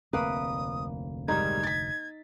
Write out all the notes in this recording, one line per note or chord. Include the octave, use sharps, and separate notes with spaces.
F1 D2 A#3 C4 B4 D#6
G#2 D#3 G3 D#4 G#6
A6 B6